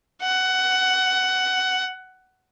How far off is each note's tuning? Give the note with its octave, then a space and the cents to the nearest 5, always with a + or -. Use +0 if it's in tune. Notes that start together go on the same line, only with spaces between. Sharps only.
F#5 +15